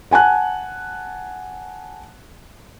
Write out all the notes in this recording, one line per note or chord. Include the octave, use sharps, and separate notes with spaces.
F#5 G#5 A5 F#6